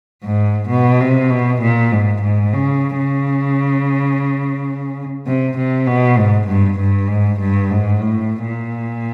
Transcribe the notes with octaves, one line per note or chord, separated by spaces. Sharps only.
G#2
B2
C3
B2
A#2
G#2
G#2
C#3
C#3
C3
C3
B2
G#2
G2
G2
G#2
G2
G#2
A2
A#2